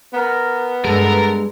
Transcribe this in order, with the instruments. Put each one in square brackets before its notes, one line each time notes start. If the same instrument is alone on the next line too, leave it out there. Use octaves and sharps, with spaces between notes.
[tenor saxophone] B3 [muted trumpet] A#4
[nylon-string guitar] G2 G#3 [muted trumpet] A4 [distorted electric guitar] A#4